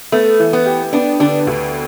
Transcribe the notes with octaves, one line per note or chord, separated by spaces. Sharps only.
A3 B3
E3
B3
G4
B3 D4
D3 D4
D2